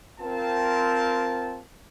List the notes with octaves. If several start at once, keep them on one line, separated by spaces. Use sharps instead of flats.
C4 F4 A#4 A5